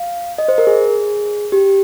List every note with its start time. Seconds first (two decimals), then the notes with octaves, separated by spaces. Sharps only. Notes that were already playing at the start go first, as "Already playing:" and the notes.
Already playing: F5
0.38 D#5
0.48 C5
0.58 A#4
0.67 G#4
1.52 G4